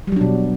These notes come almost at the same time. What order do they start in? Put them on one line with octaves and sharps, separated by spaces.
G3 F#3 D4 B2